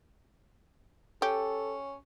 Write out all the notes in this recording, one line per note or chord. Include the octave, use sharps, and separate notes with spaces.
C#4 G4 A4